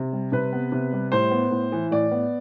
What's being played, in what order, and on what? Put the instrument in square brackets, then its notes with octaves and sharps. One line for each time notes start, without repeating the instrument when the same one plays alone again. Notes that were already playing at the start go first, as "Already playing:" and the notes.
Already playing: [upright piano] C3
G3
C3 B4
B3
C3
G3
A2 C5
B3
A2
E3
A2 D5
B3